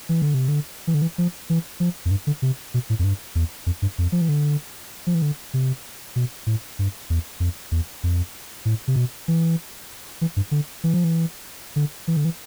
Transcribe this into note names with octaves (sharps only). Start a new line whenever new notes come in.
E3
D3
C3
D3
E3
D3
E3
F3
E3
F3
F2
G2
D3
C3
B2
A2
F2
G2
E2
F2
G2
F2
F3
E3
D3
F3
E3
D3
C3
B2
A2
G2
E2
F2
E2
F2
A2
C3
B2
E3
E3
G2
D3
E3
F3
E3
D3
E3
D3
E3